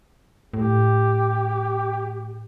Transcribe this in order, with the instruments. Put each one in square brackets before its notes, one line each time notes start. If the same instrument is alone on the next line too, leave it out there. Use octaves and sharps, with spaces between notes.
[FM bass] A2 [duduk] G4